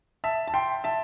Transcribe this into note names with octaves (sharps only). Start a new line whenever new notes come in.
E5 A5
A5
G5 C6
E5 A5